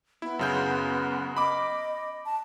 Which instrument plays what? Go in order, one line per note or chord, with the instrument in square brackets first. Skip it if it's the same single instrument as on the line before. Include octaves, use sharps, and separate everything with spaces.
[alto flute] B3 [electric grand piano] E4
[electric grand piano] F#2 C#3 G6
[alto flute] D#5 [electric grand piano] B5 D6
[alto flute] A5